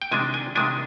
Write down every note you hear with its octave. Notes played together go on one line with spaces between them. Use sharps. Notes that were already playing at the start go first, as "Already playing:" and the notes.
G5
C3 D#3 G#3 D4 G#5
G#5
C3 D#3 G#3 D4 G#5